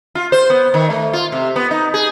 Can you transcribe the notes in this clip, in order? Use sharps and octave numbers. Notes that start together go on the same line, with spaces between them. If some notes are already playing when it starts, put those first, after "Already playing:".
F4
C5
B3
D#3
A3
F4
C3
B3
D#4
G#4